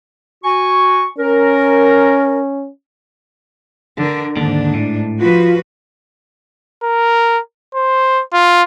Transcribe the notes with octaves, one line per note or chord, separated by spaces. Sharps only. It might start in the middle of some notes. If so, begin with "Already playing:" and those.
F#4 G#5 C#6
C#4 A#4
D3 A#4
D#2 G#2 D3 D4
A2
F3 F4 F#4 B4
A#4
C5
F4